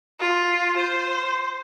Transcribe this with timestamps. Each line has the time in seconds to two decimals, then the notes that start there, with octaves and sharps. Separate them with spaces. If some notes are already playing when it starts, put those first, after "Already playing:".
0.20 F4
0.78 C5